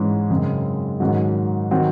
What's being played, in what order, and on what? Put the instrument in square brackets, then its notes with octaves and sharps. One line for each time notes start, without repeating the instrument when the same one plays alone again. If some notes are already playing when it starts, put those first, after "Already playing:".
Already playing: [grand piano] G#2 E3 G#3 C#4
F#2 C#3 G#3 C4
G#2 D#3 F#3 C#4 F#4
D#3 F#3 C4 F#4